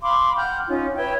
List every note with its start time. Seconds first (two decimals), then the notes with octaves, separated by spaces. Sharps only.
0.03 F5 B5 C6 D6
0.36 F#5 G5 F6 G6
0.67 C#4 D#4 F4
0.96 B4 C#5 E5 G5